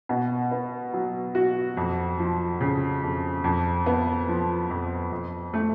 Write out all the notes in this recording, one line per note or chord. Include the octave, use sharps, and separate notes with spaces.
B2
B3
F#3
F#4
F2
F3
C#3
F2
F2
B3
F3
F2
F2
A3